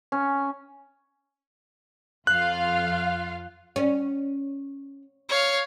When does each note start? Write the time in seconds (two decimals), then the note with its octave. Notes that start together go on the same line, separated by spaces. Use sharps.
0.12 C#4
2.27 F2 F4 F5 F#6
3.76 C#4
5.29 C#5 F5